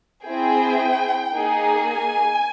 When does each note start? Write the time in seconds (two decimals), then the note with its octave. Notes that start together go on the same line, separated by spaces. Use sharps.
0.25 C4 E4 G#4 G5
1.33 A#3 D#4 G#4
1.88 G#5